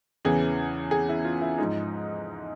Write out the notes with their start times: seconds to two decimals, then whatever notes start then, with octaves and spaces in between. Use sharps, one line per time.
0.25 E2 C#3 E3 G#4
0.91 G#4
1.09 E4
1.25 F4
1.42 E4
1.58 G#2 F3 G#3 D#4